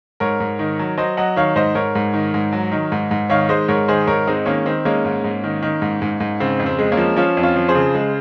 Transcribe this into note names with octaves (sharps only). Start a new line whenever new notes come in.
G#2 A#4 C#5
G#2
D#3
F#3
F#3 C5 D#5
F#3 D#5 F#5
D#3 C#5 F5
G#2 C5 D#5
G#2 A#4 C#5
G#2
D#3
G#2
F#3
D#3
G#2
G#2
D#3 C#5 F5
G#3 C5 D#5
G#2 A#4 C#5
D#3 G#4 C5
G#2 A#4 C#5
G#3 C4 D#4
D#3 A#3 C#4
D#3 C4
G#3 A#3 C#4
G#2
G#2
D#3
D#3
G#2
G#2
G#2
C#3 C4
F2
C4
G#3
A#3 C#4
F3
F3 C#4 F4
F2
C#4 F4
F3
G#4 C5
C#3
G#3